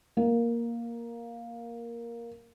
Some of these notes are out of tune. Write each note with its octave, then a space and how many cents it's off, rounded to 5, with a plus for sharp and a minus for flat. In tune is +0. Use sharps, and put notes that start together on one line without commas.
A#3 +5